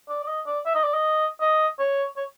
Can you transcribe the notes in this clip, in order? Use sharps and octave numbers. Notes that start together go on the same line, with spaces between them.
D5
D5
D#5
D5
E5
D#5
D5
D#5
D#5
C#5
C#5